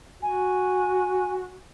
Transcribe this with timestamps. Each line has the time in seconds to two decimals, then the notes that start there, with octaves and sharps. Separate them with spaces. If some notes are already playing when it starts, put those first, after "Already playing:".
0.22 F#4 G#5